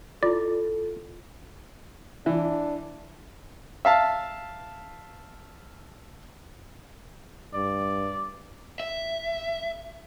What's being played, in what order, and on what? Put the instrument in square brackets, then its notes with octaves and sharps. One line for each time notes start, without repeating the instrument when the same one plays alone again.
[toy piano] E4 F4 [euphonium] A4 [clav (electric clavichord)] D5
[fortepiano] E3 [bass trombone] D4
[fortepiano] E5 F5 A5
[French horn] G2 [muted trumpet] D5
[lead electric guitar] E5